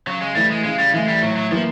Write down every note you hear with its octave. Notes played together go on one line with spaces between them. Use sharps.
C#3 F#3
G#3
E3 G3 A3
G#3
C#3 G#3
G3
E3 G#3 A3
G3
A2 F#3
F#3
E3 F3 G3 A#3